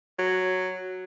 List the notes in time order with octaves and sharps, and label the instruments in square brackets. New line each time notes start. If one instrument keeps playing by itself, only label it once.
[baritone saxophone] F#3